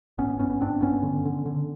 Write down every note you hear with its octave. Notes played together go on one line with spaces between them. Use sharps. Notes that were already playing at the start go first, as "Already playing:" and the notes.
G#1 B3 C#4
G2 B3 C#4
G#1 C4 D4
G2 B3 C#4
D3
D3
D3